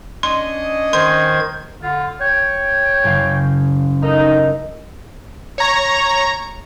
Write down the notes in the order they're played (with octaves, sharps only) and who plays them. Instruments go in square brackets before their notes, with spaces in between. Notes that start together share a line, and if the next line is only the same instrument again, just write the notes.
[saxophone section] C#4 D4 D#5 [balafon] C6
[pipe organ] D#3 C5 G#6 [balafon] C6
[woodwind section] D3 F4
C#5 G5
[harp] F#1 C#3 F5
[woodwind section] D#4 [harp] A4 A#4 D#5
[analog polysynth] C#5 A#5